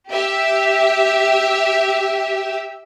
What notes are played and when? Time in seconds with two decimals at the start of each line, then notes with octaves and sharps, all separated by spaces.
0.11 G4 E5